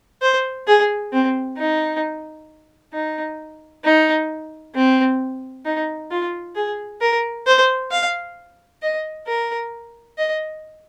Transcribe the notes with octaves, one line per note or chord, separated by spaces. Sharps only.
C5
G#4
C4
D#4
D#4
D#4
C4
D#4
F4
G#4
A#4
C5
F5
D#5
A#4
D#5